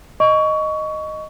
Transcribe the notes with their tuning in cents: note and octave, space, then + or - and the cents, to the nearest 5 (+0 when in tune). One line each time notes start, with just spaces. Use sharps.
D#5 -5 C#6 +20